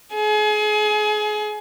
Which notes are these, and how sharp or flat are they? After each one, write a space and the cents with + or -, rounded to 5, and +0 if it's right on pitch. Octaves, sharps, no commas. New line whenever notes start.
G#4 +30